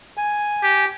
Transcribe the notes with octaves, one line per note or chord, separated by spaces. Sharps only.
G#5
G4